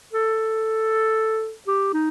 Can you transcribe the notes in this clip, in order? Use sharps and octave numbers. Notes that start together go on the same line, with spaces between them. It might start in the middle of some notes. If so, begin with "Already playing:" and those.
A4
G4
D#4